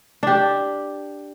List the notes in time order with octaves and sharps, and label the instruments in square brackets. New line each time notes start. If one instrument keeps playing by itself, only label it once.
[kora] D4 G4